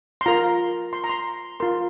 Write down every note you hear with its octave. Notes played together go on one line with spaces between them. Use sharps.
C6
F4 A#4 A#5
C6
A#5
C6
F4 A#4 C6